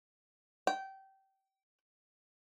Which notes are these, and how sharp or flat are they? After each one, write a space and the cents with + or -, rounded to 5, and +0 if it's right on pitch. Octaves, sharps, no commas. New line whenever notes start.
G5 -25